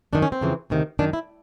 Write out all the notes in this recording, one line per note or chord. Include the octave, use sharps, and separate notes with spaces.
F#2 D#3 D4
C#4
C4
F2 C#3 E3
D2 C3 D#3
F#2 D#3 D4
E4